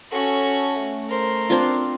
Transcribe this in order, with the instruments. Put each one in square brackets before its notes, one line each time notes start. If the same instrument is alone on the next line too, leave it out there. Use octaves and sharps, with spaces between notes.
[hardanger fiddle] C#4 F#4 [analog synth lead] A4
[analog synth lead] A3
[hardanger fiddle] A#4 C5
[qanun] C4 D4 F4